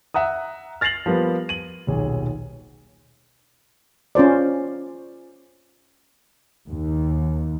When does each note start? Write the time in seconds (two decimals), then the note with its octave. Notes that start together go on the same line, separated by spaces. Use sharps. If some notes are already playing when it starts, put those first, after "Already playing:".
0.14 E5 F#5 A#5 D#6
0.81 F6 A6 A#6 C7 F7 F#7
1.06 F3 G3 A#3 B3
1.49 D#7 F#7
1.87 D#1 B1 G#4
4.15 C#4 F4 C5 D5
6.68 D#2